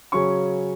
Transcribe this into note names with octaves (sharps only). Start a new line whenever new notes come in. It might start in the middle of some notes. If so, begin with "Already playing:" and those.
C#3 F#3 C#4 C#6